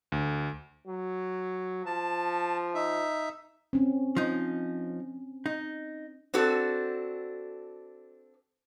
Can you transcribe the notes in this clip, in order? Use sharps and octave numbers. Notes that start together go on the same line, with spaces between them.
D2
F#3
F3 A5
D#4 E5
C4 C#4
F3 D#4
D#4
C4 D4 F#4 A4